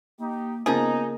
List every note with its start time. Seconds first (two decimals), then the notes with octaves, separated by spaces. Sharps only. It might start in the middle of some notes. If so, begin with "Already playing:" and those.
0.19 A#3 D#4 G4
0.66 C#3 F3 A#3 B3 D#4 G#4